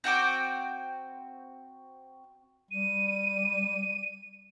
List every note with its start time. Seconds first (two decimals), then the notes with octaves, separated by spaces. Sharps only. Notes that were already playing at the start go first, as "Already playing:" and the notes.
0.04 C4 F#4 G5 D6
2.71 G3 D#7